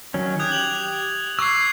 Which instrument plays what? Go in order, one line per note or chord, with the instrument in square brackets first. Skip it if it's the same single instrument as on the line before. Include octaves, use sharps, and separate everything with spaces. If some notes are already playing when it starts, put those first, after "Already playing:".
[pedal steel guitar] D#3 F#3 C#4
[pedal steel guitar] G4 [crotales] D#6 F#6 G#6
[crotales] F7 F#7
[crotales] C#6 G#6 C7 [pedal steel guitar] D6 E6